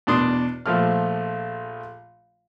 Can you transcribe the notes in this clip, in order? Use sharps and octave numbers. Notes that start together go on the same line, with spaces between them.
E2 B2 D4 C6 D#6
A#1 F3 A3 F6